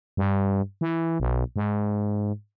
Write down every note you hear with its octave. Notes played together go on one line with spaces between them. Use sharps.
G2
E3
B1
G#2